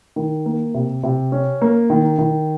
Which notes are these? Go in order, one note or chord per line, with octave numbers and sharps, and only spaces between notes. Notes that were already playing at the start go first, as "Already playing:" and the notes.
D#3
A#3
C3
C3
C#4
A#3
D#3
D#3